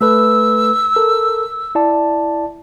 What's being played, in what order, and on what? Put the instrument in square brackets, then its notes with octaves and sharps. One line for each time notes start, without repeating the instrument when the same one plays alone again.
[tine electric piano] A3 A4 B4 [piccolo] E6
[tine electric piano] A4 A#4
E4 D5 A5